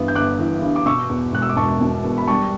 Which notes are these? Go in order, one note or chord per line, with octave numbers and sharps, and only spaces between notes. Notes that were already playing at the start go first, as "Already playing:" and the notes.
Already playing: G2 E3 B3
G6
G1 D6 F#6
E3
G2
D6
B2 C#6 E6
E2
E1 F#6
E6
D6
E1 A5 C#6
B2
E2
B5
G3 A5 C#6